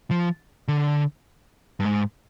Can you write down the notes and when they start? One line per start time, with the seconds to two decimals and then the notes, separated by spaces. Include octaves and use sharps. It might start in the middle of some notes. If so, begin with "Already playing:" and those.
0.11 F3
0.68 D3
1.80 G2
1.85 G#2